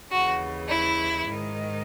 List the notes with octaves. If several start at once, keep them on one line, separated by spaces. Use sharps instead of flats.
D#2 C#3 E3 F#4
E4
G#2 D#3